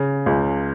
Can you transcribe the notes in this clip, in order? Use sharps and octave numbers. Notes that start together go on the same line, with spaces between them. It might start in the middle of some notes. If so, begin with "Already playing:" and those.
Already playing: C#3
C#2